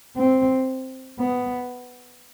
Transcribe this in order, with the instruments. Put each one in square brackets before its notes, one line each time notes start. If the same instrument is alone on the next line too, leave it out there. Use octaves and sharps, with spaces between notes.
[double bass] C4
B3